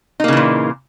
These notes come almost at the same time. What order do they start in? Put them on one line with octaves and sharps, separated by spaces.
D#4 A#3 C#3 E3 A#2